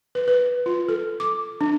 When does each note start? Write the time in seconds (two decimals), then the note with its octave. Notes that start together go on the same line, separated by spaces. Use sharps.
0.15 B4
0.28 B4
0.66 F4
0.89 A4
1.20 D6
1.61 D4